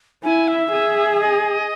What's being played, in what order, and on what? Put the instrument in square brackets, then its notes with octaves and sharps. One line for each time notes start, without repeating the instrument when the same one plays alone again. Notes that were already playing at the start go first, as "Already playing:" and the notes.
[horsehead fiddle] E4 [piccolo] G#5
[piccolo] E5
[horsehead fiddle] G#4
[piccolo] D#5